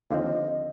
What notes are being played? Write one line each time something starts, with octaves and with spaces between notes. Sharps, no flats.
D#2 D3 F3 C4 D#5 F5